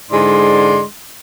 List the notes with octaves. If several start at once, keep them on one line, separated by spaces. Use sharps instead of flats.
G#2 D3 G#3 E4 D5 C6